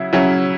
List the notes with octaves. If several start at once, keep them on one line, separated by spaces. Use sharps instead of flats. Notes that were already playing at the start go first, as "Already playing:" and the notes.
Already playing: C#3 F#3 E4
C#3 F#3 C#4 E4